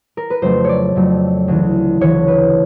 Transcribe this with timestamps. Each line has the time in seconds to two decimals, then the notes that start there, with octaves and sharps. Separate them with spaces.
0.17 A#4
0.30 B4
0.42 F2 C#3 F#3 A3 C5
0.65 C#5 D5
0.95 F2 C#3 F#3 A3
1.48 D2 C#3 E3
2.01 D2 C#3 E3 C#5
2.28 B4